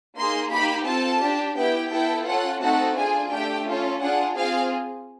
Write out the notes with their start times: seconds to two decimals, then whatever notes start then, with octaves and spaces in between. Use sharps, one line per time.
0.17 A#3 D#4 G#4 C6
0.52 A#3 D#4 G4 B5
0.86 C4 F4 A4 A5
1.22 D4 G4
1.57 B3 E4 G4 G5
1.91 B3 E4 A4 G5
2.27 C#4 F4 A4 F#5
2.62 A3 C4 D#4 F#4 A4 F#5
2.97 D4 F4 G#4 G#5
3.31 A3 D4 G4 G5
3.67 C#4 F4 A4
4.01 D4 F4 G#4 F#5
4.36 C4 F4 G#4 F5